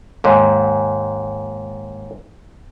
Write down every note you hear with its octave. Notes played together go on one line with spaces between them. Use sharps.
D#2 G#2